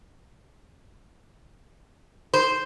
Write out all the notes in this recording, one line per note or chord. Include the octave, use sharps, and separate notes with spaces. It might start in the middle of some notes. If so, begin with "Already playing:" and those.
C5